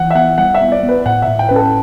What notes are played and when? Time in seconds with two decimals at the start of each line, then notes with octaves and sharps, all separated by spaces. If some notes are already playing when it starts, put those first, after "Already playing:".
Already playing: E3 F#5
0.11 E5
0.15 B3 F#5
0.38 G3 F#5
0.55 E5
0.61 B3
0.72 D5
0.83 B3
0.89 B4
1.05 A2 F#5
1.22 E5
1.27 A2
1.39 G5
1.49 C#4 B4
1.56 A4